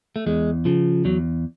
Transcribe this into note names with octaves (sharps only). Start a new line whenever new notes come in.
A3
E2 G#3
C#3 F3
E2 F#3